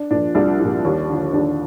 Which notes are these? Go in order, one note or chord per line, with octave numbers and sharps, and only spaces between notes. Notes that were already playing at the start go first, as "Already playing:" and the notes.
Already playing: D4
A#2 F3 D4
C2 D4
A#2 F3
D#2
D3 F3
D#2 D4